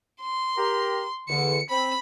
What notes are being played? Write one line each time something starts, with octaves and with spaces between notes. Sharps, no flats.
C6
G4 A#4 A#5
E2 D3 C#7
C4 B5